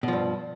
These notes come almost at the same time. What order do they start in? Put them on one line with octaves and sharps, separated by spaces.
B2 F3 G2